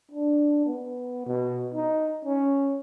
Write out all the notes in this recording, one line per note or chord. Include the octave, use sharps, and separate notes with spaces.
D4
B3
B2
D#4
C#4